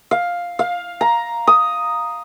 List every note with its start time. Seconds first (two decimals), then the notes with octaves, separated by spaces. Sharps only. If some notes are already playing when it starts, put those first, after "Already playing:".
0.11 F5
0.59 F5
1.01 A#5
1.47 D#6